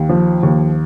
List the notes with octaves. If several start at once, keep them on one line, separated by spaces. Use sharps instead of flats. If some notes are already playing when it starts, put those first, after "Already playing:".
Already playing: D#2
F3
D#2